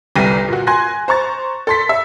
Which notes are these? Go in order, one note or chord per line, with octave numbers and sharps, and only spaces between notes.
G1 C2 G3 A#6 D#7
A#2 F#4
G#5 C6 F#6 A#6
C5 A#5 C#6 A6
A4 C6 B6
E5